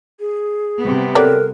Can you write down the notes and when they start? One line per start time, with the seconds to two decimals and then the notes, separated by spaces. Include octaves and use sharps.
0.20 G#4
0.79 C3 G3 B3
1.15 F#3 G4 A4 A#4 D5 F#6